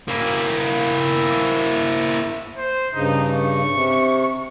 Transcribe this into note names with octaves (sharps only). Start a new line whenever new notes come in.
A#3 E4
C5
G2 C#3 D#4
C#6
C3